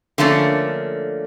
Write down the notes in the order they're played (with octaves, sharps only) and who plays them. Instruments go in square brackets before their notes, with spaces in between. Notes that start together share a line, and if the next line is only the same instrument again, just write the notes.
[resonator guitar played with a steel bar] D3 F3 A3 A#3 C#4